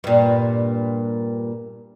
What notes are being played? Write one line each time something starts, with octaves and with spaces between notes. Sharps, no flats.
G2 A#2